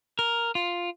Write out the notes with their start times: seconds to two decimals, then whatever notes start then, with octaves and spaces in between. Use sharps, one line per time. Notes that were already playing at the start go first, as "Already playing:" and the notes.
0.19 A#4
0.55 F4